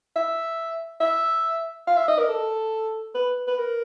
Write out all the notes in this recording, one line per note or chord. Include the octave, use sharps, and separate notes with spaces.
E5
E5
F5
E5
D#5
A#4
A4
B4
B4
A#4